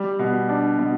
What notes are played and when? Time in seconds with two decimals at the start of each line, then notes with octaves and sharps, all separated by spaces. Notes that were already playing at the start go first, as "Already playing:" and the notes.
Already playing: G3
0.19 B2
0.49 D4
0.79 B2